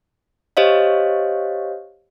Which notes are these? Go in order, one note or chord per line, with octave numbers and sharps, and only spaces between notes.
G4 C5 C#5 D#5 F5